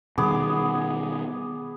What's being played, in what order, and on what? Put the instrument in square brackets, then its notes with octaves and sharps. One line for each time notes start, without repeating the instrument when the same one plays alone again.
[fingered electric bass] B2 D#3 G3 [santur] B3 G#4 D6